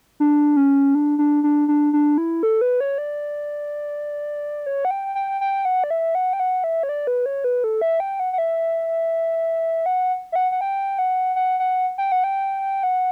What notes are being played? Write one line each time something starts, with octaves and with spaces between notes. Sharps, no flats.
D4
C#4
D4
D4
D4
D4
D4
E4
A4
B4
C#5
D5
C#5
F#5
G5
G5
G5
F#5
D5
E5
F#5
G5
F#5
E5
C#5
D5
B4
C#5
B4
A4
E5
G5
F#5
F#5
E5
F#5
E5
F#5
F#5
G5
F#5
F#5
F#5
G5
F#5
G5
F#5